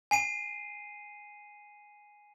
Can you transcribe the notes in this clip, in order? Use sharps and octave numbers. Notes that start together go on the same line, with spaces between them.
G#5 C7 D#7